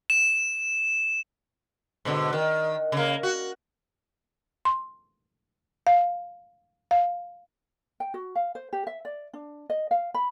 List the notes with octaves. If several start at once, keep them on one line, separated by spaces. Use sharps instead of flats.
E7
G#2 B2 D3
D#3
C#3 A#3
F#4
C6
F5
F5
G5
F#4
F5
C5
G4
E5
D5
D4
D#5
F5
B5